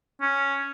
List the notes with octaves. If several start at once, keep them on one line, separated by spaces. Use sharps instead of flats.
C#4